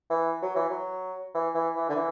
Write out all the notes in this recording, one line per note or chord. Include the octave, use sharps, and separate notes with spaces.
E3
F#3
E3
F#3
E3
E3
E3
D3
E3